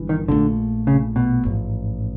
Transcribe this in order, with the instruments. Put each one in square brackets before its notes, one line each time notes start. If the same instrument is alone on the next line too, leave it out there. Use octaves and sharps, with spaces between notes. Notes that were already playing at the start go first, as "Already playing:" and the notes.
Already playing: [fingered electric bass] G1 G2 E3
[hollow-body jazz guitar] D#3
[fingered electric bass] A#1 A#2 F3 A3 [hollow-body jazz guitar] D3
[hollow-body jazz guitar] C#3
B2
[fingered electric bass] A1 G#2 F3